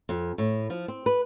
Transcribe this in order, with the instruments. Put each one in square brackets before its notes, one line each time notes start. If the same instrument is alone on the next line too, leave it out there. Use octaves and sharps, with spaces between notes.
[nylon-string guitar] F2
A2
F3
C4
B4